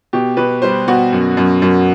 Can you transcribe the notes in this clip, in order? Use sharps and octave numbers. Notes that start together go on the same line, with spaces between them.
B2 G4
B2 B4
G3 C5
B2 F#4
F#2
F#2
F#2